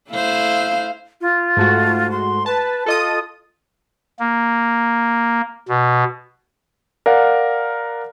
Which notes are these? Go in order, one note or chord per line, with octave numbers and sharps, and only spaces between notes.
A3 E4 C5 F5
F4
G#2 A3 F#4
C6
B4 A5
F4 A4 D#5 D#6
A#3
B2
A#4 D5 F5 F#5